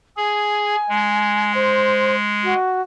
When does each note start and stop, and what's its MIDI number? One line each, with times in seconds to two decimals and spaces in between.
0.17 0.76 68
0.17 1.52 80
0.89 2.54 56
1.55 2.15 72
2.44 2.82 66